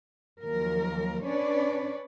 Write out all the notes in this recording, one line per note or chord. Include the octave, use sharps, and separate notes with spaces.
D#2 F3 F#3 A#4
C#4 D4 B4 C#5 D5